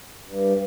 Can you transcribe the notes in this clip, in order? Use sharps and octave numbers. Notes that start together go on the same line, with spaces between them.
G2